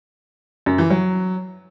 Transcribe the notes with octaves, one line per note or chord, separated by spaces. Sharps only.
F#2
E3
F#3